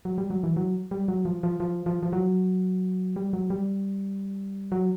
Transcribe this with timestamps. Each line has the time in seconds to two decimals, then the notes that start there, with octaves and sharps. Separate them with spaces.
0.05 F#3
0.18 G3
0.30 F#3
0.43 E3
0.57 F#3
0.91 G3
1.08 F#3
1.25 F3
1.43 F3
1.60 F3
1.86 F3
2.03 F3
2.13 F#3
3.16 G3
3.33 F#3
3.50 G3
4.72 F#3